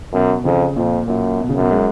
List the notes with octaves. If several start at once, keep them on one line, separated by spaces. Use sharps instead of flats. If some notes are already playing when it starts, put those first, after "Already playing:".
F#2 B2
F2 C#3
F2 A#2
F#2 A#2
B2
C#3
F#2 B2
G#3